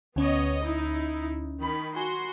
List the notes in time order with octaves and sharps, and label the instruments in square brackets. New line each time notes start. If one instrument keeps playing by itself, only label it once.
[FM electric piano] D2 C#4 [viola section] B3 C#5 D#5
[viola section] D#4 E4
D#3 B5
[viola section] F#4 C6 [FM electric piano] G#5 B5